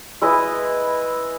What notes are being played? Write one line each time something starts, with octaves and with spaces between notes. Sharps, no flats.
G#3 E4 B4 D#5